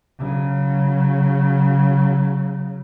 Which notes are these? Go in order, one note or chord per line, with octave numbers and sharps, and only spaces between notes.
C#3 F#3